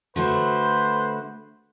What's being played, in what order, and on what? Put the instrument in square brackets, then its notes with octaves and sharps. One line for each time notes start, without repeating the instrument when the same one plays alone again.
[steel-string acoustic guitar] D3 A3 F#4 [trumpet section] B4 C5